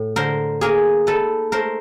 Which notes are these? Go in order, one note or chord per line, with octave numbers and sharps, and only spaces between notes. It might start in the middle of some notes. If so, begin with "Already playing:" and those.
Already playing: A2
D3 A#4 C5
A#3 G#4 A#4
D#4 A4 B4
A3 A#4 C5